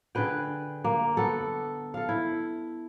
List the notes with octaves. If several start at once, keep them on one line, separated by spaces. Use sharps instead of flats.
D3 G#4 B4 G5
A#3
B3 A4
A4 F5
E4